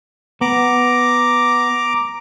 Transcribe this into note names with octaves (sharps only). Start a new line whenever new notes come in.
B3 A#5 D6